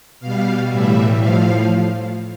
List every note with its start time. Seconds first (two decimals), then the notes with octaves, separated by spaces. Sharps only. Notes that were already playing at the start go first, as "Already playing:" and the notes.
0.20 B2 G3 F5
0.69 A2 E3 G3 E5
1.19 A2 F3 F5